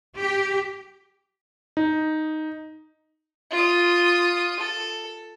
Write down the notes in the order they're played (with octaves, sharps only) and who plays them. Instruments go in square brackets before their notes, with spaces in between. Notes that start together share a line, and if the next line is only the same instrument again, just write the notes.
[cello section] G4
[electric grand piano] D#4
[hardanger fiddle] F4 D#6
A4